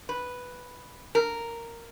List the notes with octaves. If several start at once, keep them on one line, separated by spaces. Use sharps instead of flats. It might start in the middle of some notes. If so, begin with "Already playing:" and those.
B4
A#4